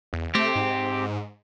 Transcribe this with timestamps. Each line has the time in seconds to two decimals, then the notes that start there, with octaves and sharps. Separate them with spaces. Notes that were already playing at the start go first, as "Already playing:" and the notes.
0.13 E2
0.35 A3 C4 G4
0.55 G#2